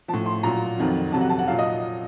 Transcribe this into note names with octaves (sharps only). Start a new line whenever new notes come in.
F3 A5
A2
C6
A#2 F#3 A#5
F2 D#3 F#3
F2 C3 F#3 A5
F#5
A5
F#5
A#2 F#3 F5
D#5